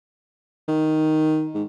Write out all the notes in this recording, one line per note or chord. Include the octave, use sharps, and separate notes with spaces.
D#3
G#2